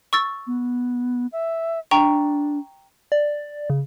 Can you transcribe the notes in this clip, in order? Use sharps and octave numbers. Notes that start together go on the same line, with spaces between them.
C#6 E6 A6
B3
E5
D4 G5 A#5 C#6
D5
C#3